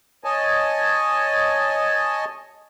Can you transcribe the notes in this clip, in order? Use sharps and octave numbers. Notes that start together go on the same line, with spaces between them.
C#5 D#5 G#5 A5